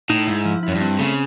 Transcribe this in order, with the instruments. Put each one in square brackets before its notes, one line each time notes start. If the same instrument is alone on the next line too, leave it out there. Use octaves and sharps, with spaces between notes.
[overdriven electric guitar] A2 [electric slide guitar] D#4
[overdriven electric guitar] G#2 [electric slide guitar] E4
[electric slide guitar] F3
[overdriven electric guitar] F#2 [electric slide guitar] E4
[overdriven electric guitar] G2
[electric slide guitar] C4
[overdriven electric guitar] C#3 [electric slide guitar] A3